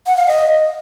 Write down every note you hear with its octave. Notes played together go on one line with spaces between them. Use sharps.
F#5
F5
D#5